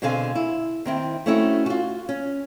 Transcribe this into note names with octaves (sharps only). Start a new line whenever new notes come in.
B2 D3 C4 G#4 F5 G#5
E4
D#3 C4 E4
A3 C4 C#4 D#4 E4 F#4
F4 F#4
C#4